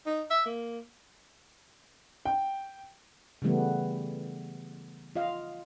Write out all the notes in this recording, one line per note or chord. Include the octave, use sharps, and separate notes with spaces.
D#4
E5
A#3
G5
C#3 E3 G3 A3 B3
F4 D#5 F5